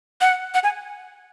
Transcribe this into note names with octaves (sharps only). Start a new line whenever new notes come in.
F#5
F#5
G#5